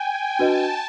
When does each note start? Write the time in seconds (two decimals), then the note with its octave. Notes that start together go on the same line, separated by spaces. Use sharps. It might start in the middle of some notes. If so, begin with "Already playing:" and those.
Already playing: G5 G#5
0.39 D4 F#4 B4 D#5 A5